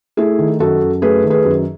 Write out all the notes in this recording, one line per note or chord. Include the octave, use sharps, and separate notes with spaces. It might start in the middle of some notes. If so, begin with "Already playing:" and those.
A3 E4 G#4
D#3
F#2 F#4 A4
F#2
A3 G#4 B4
D#3
G#4 B4
F#2